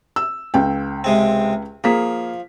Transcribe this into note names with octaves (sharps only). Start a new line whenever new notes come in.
E6
C#2 G5
C3 G#3 C4
F3 A#3 G#4 B6